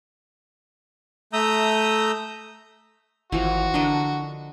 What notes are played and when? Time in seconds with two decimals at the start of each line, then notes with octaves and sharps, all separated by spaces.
1.33 A3 E5 A#5 D#6 E6 G6
3.32 G#1 E3 F3 F#4
3.74 D3 D4 A#4 D#5